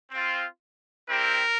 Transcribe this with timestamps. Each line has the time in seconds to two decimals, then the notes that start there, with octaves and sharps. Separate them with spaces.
0.11 C4 F4
1.08 G3 C4 E4 G4 A#4